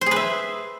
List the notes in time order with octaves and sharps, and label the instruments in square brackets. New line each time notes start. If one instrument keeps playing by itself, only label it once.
[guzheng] C5
G#4
B4
E5